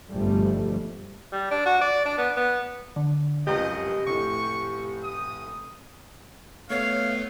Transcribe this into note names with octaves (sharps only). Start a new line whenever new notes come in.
G1 G2 B2 F3 G3 A3
G3
D4
F#4
D5
D4
B3
B3
D3
F1 C#2 F#2 G4 D#5
F1 A2 C#6
D#6
A3 B3 C#5 F5